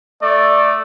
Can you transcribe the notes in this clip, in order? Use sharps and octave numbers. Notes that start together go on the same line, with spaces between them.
A3 D5